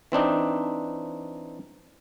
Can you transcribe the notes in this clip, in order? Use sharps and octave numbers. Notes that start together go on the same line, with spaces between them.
E3 C4 D4 D#4